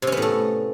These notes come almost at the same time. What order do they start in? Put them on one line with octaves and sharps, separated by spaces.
C3 C#4 B3 A2 A3